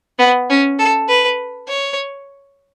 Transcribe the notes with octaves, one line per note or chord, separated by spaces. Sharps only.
B3
C#4
A4
B4
C#5